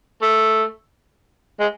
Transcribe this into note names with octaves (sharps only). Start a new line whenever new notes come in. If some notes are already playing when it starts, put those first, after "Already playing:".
A3
G#3